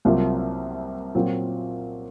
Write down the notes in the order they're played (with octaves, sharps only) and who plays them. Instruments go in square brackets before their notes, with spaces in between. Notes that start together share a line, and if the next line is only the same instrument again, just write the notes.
[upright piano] C2 C3 F#3 A#3 F4
A#2 F#3 C4